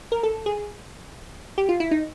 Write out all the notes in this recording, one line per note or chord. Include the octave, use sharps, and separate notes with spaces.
A#4
A4
G#4
G4
F4
E4
D#4